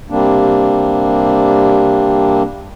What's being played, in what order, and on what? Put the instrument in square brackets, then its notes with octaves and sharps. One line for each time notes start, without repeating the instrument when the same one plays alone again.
[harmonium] C3 G3 A#3 C4 D4